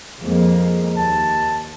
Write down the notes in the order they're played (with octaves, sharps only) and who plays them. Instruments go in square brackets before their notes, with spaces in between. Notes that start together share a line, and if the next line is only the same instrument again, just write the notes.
[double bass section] F2 G#3 A#3
[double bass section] D#2 [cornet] A5